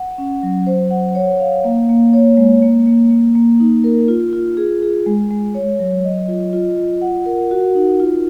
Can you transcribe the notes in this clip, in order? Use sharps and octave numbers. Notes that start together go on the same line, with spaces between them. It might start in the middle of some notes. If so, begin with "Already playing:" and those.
Already playing: F#5
C#4
F#3
C5
F#5
C#5
F5
A#3
A#3
C#5
G#3
A#3
A#3
A#3
A#3
D#4
A#4
F4
F4
G#4
G#4
G#3
G#3
C#5
F#3
D#5
F4
F4
F4
F#5
A#4
F#4
D#4
F4